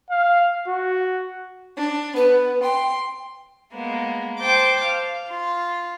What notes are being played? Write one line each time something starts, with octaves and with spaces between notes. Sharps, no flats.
F5
F#4
D4
B3 B4
G5 C6
G#3 A#3 B3
C5 G5 A5 D6
F5
F4